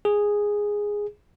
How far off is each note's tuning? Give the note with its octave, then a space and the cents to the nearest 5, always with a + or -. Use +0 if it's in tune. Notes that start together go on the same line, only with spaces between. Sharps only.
G#4 -5